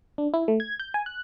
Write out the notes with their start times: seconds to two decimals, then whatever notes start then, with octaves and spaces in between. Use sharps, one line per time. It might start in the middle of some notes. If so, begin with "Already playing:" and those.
0.18 D4
0.34 E4
0.48 A3
0.60 G#6
0.80 G6
0.94 G#5
1.06 F#6